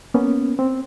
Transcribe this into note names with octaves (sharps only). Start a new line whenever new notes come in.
A#3 B3 C#4
C4